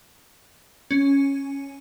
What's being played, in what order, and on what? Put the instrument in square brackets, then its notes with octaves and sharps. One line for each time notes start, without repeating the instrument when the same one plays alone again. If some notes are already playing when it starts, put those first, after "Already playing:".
[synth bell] C#4